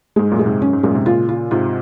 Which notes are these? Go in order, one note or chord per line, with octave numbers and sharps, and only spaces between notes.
G#2 G#3
F#2 A#2
G#3
G#2 C3
F#2 C#4
G#2
F#2 A#2 G#3
G#2 C3
A#2 C#3 F4
F4
G#2 C3 F4